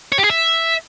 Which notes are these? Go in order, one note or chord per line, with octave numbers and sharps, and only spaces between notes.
C#5
G4
G#4
E5